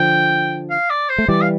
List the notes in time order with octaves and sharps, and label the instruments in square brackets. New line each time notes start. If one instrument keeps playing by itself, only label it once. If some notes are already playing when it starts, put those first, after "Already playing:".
Already playing: [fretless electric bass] D3 F3 [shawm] G5
[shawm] F5
D5
C5
[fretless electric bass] A3
[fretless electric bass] E3 G3 [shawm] D5
[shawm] F5